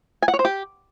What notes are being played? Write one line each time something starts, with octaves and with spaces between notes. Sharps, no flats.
G#5
F#5
C#5
C5
G4